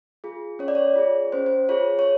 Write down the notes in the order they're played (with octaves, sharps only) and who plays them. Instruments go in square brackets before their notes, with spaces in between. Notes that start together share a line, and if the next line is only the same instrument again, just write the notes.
[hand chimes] F4 G#4
C#4 C#5
D5
C#5
F4 G#4
C#4 C5
C5
F4 G#4 C#5
C#5